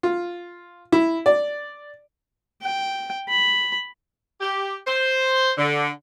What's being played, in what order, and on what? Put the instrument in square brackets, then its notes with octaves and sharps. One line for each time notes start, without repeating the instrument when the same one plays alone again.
[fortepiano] F4
E4
D5
[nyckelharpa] G5
B5
[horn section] G4
C5
D3